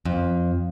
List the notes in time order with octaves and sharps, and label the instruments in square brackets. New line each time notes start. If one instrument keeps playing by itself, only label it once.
[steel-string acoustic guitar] F2